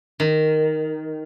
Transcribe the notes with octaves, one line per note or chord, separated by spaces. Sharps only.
D#3